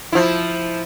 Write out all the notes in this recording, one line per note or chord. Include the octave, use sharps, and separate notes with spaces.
F3 E4